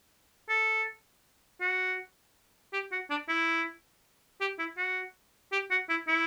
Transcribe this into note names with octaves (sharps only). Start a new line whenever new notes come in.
A4
F#4
G4
F#4
D4
E4
G4
E4
F#4
G4
F#4
E4
E4